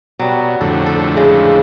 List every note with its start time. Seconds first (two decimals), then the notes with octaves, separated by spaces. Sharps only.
0.19 B2 F#3 G3
0.61 F2 A2 D3 A4
0.86 A4
1.16 C#3 G#3